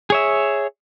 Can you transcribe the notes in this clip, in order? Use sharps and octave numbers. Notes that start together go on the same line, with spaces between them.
G#4 C#5 E5